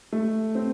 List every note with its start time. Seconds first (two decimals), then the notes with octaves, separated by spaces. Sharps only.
0.13 A3
0.55 C4